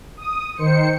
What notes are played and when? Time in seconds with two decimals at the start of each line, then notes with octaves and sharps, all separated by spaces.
0.17 D#6
0.57 D#3 C5 C#7